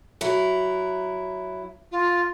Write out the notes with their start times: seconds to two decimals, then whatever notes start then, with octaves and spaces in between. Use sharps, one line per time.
0.21 F#3 E4
1.91 F4